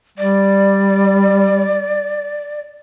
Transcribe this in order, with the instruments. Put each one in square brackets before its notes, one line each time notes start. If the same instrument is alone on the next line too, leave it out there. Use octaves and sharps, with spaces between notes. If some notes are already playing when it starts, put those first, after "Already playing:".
[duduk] G3 [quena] D5